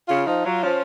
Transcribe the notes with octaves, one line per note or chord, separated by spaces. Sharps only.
C#3 F4
F3 D#4
F#3 F4
F3 C#4